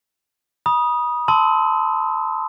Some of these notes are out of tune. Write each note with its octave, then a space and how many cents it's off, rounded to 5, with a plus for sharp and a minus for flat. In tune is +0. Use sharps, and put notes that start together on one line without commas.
B5 -40 D#6 +0
A5 +0 C6 -15 E6 -30